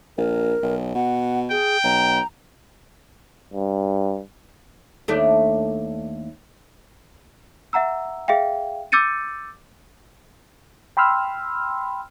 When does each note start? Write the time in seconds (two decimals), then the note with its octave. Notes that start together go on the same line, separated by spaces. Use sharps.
0.18 A#1 A#4
0.63 B1
0.95 B2 F#5
1.51 G#4 G5
1.84 B1 A#5
3.53 G2
5.08 D#2 A3 D4
7.73 E5 F#5 A#5 E6
8.28 G#4 E5 F5 G5
8.92 D6 E6 G6 A6 C#7 D#7
10.97 G5 B5 C6 E6 F6